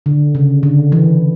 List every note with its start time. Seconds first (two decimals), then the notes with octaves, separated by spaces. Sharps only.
0.06 D3
0.35 C#3
0.63 D3
0.92 E3